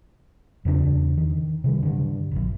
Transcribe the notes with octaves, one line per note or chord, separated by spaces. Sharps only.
E2 C#3 A#3 D4
D#3
C3 D#3 G3
G2 D3
D#1 A#1